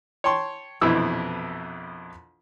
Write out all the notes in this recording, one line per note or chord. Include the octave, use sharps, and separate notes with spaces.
C#5 G5 A5 C6 C#6
A#1 F2 B2 E3 E4 E6